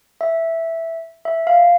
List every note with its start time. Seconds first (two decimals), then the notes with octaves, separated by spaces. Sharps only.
0.21 E5
1.25 E5
1.47 F5